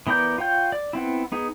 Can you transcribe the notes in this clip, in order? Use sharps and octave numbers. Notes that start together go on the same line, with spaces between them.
E3 B3 A#4 D5 G6
F4 C#5 G5 G6
D5
B3 C4 E4
B3 D#4 G#4